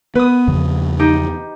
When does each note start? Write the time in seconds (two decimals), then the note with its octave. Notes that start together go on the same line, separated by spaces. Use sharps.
0.15 B3 B4 D#6
0.48 E2 C#3 F3
0.99 D#4 G4